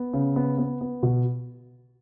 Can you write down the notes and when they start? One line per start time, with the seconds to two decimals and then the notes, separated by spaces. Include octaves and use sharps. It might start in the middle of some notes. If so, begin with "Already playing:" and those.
Already playing: B3
0.13 C#3
0.36 B3
0.58 B3
0.81 B3
1.03 B2